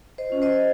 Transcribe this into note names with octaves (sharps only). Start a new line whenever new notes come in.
C5 D#5
C#4 F4
C5 D#5